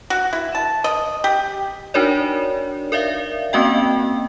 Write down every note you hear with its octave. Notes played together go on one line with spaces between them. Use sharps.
F#4
E4
A5
D#5
G4
D4 D#4 F#4 A#4 C#5 D5
A#4 D5 E5 F5
A#3 C4 C#4 F#4 D#5 G5